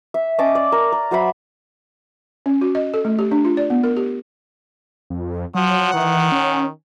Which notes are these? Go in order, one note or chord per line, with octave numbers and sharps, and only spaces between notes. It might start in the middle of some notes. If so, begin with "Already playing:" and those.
E5
C#4 D#5 A5 D6
D5
A#4
A#4
F#3 C5 E5 B5
C#4
F#4
D#5
A4
A3
G4
D4
F4
D5
B3
A#4
G4
F2
F3 F#3 F#5
D#3 E3
C#4